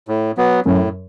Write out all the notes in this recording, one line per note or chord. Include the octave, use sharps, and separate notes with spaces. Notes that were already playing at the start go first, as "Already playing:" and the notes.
A2
F#3 B3
F#2 A2